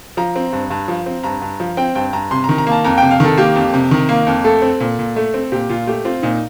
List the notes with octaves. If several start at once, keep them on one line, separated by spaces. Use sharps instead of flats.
F3 A#5
C4
G2
G2
F3
C4
G2 A#5
G2
F3
C4 G5
G2 G5
G2 A#5
C3 C6
D#3 A#5
A#5
A#3 A5
F2 A#5
C3 G5
F5
D#3 A4
A#3 G4
F2
C3
D#3
A#3
F2
A3 A4
C4
A#2
A#2
A3
C4
A#2 G4
A#2 F4
A3 G4
C4 F4
A#2 D#4